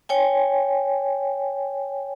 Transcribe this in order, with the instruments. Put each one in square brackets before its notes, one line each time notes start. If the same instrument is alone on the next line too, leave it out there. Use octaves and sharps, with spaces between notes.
[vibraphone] C#5 G5 G#5